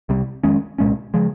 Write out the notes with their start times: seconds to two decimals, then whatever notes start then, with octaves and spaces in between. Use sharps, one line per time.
0.09 C2 C3 G3
0.44 F2 D#3 G#3 C#4
0.78 C2 A#2 G#3 C#4
1.14 C#3 F3 G#3